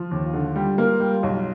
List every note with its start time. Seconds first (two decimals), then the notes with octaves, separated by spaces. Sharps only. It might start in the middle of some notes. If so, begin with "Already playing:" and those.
Already playing: F3
0.11 D#2
0.26 F4
0.33 D3
0.56 G3
0.78 A#3
1.00 G3
1.23 B1